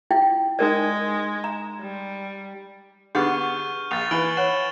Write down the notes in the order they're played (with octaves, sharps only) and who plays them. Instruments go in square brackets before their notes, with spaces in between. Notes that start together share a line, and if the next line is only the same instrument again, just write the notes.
[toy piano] E4 F4 G5
[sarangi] G#3 [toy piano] D#4 A#4 D5
[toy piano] A#5
[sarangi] G3
[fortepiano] D3 B3 [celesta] G4 G#4 F#5 [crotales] C#6 F6 G6
[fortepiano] A#1 [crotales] A6 F7
[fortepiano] E3 [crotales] D7 F#7 G7
[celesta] C#5 F#5 [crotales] E7